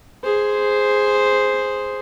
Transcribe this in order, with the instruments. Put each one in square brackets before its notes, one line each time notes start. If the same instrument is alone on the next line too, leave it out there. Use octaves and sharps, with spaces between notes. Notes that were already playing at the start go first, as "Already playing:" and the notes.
[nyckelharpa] G#4 C5